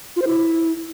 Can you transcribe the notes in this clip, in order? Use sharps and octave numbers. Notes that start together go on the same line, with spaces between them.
F4
C5
E4